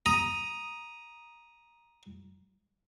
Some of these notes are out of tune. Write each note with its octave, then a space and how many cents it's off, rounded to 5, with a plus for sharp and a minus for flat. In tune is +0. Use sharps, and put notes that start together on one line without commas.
A#5 +15 D#6 +0